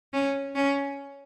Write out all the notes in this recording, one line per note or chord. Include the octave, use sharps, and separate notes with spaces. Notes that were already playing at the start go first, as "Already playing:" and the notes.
C#4
C#4